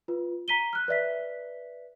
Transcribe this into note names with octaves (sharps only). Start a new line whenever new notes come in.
F4 B4
A#5 B6 D#7 G7
F6 F#6
B4 D5 E5 B6